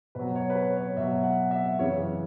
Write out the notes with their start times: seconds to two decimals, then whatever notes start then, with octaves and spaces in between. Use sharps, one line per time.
0.15 B2 F#3 B4
0.35 C#5
0.50 B4
0.55 C#5
0.76 C#5
0.97 B2 F#3 E5
1.24 F#5
1.51 E5
1.79 F#2 C#3 E3 C#5